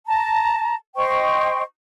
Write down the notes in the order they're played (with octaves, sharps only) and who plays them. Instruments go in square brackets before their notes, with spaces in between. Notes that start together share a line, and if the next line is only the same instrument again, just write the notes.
[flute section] A5 A#5
C5 D#5 G5 C#6